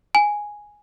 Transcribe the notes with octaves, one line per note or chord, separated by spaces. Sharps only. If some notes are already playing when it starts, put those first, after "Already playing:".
G#5